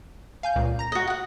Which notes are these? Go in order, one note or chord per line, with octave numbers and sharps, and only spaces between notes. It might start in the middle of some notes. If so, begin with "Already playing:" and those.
F5 G#5 G6
C#2 A#2
A#5 A#6
F#4 D#5
F#4 F#5